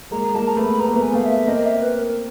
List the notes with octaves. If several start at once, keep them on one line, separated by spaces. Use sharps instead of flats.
G#3 A#3 A#5
G#3 A#3 A5
A#5
A3 B3 B5
B3 A#5
A#3
A3 B3
G#5
A3 B3 F5
E5
A#3 C4 D#5
E5
B4
A#4